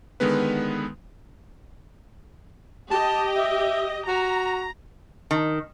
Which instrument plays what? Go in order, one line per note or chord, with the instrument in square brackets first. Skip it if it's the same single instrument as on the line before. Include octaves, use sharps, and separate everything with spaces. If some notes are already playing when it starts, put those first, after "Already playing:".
[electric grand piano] D3 D#3 G#3 B3 B4
[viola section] G4 D#5 [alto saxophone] A5
[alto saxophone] E5
[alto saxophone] F#4 [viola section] A#5
[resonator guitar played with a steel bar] D#3